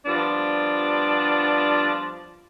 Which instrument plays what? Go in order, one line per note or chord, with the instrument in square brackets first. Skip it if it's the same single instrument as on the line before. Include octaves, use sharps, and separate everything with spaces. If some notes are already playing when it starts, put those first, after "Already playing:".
[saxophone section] F3 G3 B3 D4 F4